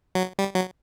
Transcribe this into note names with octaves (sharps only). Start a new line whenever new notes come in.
F#3
G3
F#3